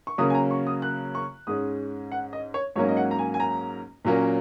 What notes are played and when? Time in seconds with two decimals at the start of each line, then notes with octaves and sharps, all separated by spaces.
0.07 C#6
0.18 C#3 F#3 A#3 C#4 D#6
0.30 G#5
0.35 A#5
0.51 C#6
0.67 D#6
0.82 F#6
1.15 C#6
1.47 G#2 G#3 C#4 D#6
2.12 F#5
2.33 D#5
2.54 C#5
2.76 G#2 F#3 A#3 C#4 C#5
2.89 D#5
2.97 F#5
3.11 A#5
3.19 G#5
3.34 G#5
3.40 A#5
4.05 A#2 F#3 A#3 C#4